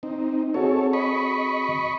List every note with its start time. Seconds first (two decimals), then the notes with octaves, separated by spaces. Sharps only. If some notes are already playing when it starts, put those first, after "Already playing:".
0.03 C4 D#4
0.54 C4 F#4 G#4 A4 C#5
0.93 D#5 B5 C#6